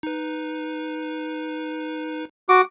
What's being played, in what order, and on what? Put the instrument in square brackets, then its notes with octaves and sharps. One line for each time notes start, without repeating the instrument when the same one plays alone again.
[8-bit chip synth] D#4 B4
[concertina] F#4 D6 [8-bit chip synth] F#5